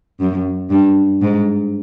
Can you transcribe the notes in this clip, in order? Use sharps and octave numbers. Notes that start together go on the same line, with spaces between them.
F#2
G2
G#2